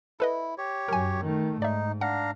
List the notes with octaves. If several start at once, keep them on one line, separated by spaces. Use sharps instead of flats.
E4 A4 B4 D#5
G4 C#5
F#2 F#3 A#4 G#5
D#3 A3
G#2 D#4 D5 E5
D4 F5 F#5 A#5